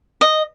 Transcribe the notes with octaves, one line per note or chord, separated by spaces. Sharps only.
D#5